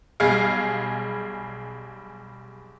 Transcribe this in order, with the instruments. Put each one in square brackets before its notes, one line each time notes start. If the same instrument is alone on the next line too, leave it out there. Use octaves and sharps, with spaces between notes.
[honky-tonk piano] B1 G3 G#4 F5